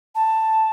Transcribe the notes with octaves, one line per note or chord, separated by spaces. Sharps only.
A5